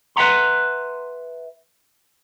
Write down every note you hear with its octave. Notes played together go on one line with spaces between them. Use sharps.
B4 E5 F#5 A#5 C6